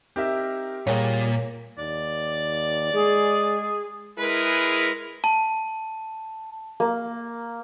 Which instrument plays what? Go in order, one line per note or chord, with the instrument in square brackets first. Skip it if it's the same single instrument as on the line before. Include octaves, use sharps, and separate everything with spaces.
[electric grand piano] C4 D#4 A#4 [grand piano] G4 E5
[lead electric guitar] A#2 [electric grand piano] G3 G#4 [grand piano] A#3 [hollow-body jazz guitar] C#5 F#5 G5
[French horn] D#2 [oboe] D5
[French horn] G#3 [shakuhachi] G#4
[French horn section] G#3 E4 G#4 A#4 B4
[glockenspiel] A5
[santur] A#3